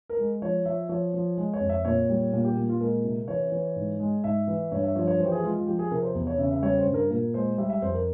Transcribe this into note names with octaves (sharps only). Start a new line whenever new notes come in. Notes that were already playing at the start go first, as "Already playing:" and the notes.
A#4
G#3
F3 C#5
F3 E5
F3 C#5
F3
G#3
C#5
F2
E5
A#2 C#5
G3
A#2
G4
A#2
F4
G#3 A#4
C3
E3 C#5
E3
G#2
G#3
G#2 E5
E3
G2 C#5
E5
F3 C#5
C#5
E3 C5
G4
G#4
G#3 F4
F4
F3 G4
G#4
C3 A#4
C5
E2
C#5
C#3 E5
E5
G3 C#5
C5
G2
A#4
A#2 A#4
G#3 C5
G3 E5
E5
F2 C5
A#4